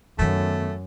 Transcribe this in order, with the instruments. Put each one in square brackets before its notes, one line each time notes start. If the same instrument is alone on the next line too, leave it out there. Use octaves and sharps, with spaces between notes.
[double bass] F#2 [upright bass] D#3 B3 [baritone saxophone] A3